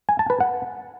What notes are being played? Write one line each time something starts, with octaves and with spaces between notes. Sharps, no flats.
G#5
A5
B4
F#5